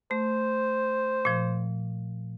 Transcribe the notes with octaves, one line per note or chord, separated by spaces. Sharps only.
A3 C5
A#2 F3